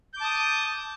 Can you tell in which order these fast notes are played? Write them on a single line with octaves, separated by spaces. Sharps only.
G6 D6 A5 D#6